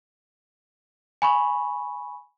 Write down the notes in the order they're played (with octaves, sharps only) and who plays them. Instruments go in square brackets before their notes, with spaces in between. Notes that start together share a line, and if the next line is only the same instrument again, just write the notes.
[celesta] G#5 B5 C#6